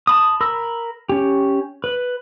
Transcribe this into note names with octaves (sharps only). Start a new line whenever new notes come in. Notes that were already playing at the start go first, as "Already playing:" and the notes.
A5 B5 D#6
A#4 B5 E6
C#4 G4
B4